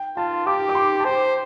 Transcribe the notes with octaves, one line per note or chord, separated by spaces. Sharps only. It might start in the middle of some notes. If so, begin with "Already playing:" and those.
Already playing: G5
F4 A5
G4 D6
D6
C6
A5
C5 G5